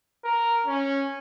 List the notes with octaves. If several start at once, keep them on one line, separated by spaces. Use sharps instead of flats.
A#4
C#4